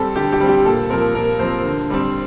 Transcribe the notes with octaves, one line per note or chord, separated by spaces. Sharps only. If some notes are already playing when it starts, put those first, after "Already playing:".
Already playing: G3 C4 G4 A4
D3 G4
G4
G3 C4
G4
A#2 A4
F3 C4 A#4
A#2 A#4
F3 C4 C5
D3
G3 C4